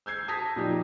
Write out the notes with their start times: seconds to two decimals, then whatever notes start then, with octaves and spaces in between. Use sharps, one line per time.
0.06 E6 G6 G#6 C7
0.28 A5 D#6 G#6 A#6 B6
0.56 A#2 F3 D#4 G4